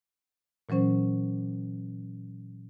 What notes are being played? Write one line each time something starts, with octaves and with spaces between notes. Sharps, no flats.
A#2 E3 F#3 C#4 C5